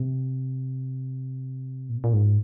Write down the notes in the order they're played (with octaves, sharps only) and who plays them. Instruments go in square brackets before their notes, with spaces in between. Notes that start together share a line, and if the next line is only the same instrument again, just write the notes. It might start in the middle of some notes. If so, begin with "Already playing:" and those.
Already playing: [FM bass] C3
A#2
C3
A#2
G#2